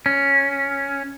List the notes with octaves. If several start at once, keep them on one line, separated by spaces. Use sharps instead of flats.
C#4